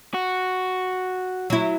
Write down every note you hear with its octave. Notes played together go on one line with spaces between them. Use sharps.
F#4
F#3 E4